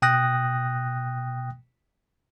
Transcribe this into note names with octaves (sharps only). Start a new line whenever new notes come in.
B2 G5 D#6 F#6 A#6